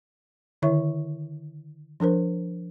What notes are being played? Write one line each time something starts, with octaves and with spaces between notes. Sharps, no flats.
D3 D#3 E4 C#5 E5 C#6
F3 D4 A#4 C5